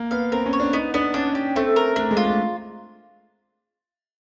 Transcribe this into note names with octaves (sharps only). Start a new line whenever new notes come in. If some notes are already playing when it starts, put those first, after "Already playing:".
Already playing: A#3
B3 F5
C4 A#4
C#4
C#5
D4
B3 D#4
B3 D4
C#4 D4
G4
A3 C4
A#4
A3 D4
G#3
F4
A3